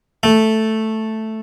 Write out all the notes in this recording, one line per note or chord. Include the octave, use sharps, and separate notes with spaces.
A3